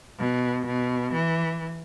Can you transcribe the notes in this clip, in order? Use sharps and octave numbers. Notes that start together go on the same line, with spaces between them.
B2
B2
E3